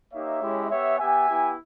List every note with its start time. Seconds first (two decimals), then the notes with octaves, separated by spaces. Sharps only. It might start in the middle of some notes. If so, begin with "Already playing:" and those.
0.13 A#3 D#4 G4 C#5 E5
0.42 G#3 C#4 E4 G4
0.70 B3 G4 C#5 E5
0.99 B3 G4 E5 G#5
1.28 B3 E4 G4